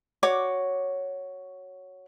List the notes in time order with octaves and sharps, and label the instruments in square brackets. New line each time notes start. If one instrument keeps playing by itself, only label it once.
[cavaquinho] F#4 C#5 D6